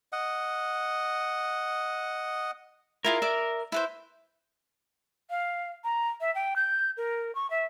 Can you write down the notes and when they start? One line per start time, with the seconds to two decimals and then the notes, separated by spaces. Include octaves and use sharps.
0.12 D#5 F#5
3.05 E4 F4 G#4 A#4
3.22 D5 E5 D6
3.72 E4 B4 C5
5.30 F5
5.84 A#5
6.21 E5
6.35 G5
6.56 G6
6.97 A#4
7.35 C#6
7.50 E5